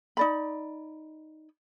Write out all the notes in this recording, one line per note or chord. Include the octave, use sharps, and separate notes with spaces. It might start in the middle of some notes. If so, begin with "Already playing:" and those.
D#4 D5 B5